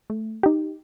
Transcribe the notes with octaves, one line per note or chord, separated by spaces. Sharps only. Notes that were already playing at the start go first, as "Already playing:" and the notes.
A3
D#4 G4